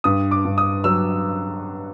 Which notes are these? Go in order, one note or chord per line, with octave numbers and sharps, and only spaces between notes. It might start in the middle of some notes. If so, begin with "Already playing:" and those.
G2 D#6
D6
G2
D#6
F#3 E6